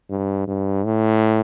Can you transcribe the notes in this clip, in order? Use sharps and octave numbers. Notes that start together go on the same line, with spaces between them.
G2
G2
A2